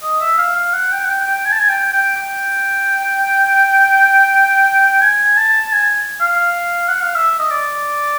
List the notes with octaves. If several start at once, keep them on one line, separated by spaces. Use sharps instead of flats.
D#5
E5
F5
F5
F#5
G5
F#5
G5
G5
G#5
A5
G#5
G5
G5
G5
G#5
A5
G#5
F5
F#5
F5
E5
D#5
D5